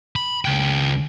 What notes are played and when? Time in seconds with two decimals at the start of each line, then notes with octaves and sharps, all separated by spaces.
0.16 B5
0.45 C#2 G5